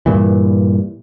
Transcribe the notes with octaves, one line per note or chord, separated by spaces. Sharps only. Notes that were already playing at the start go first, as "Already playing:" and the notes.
G2 A#2 E3